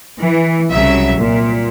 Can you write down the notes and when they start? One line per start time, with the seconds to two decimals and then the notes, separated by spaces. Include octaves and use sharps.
0.20 E3
0.71 C2 C#3 F#3 E5
1.17 C2 A#2